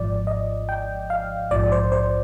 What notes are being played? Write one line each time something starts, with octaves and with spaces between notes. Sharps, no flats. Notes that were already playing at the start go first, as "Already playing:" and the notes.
Already playing: G#1 G#2 F3 D5
D#5
G5
F5
A#1 G#2 F3 D5
C5
C5